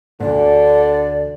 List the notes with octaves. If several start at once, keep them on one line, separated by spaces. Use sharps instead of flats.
D2 G#2 D3 D5